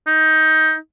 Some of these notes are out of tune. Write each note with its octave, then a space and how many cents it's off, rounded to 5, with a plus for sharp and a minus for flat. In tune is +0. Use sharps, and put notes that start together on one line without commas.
D#4 +15